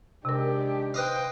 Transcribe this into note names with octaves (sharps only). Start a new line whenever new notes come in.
C3 D#3 G#3 D4 G4 A#4
B4 C5 D#5 F5 G5